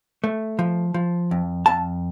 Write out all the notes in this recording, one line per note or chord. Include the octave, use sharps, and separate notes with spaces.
A3
F3
F3
F2
F2 A5